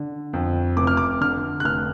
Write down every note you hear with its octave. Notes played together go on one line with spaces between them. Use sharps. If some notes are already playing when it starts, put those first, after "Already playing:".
Already playing: D3
F2
F1 D6
F6
D6
D3 F6
F#6
F1 F6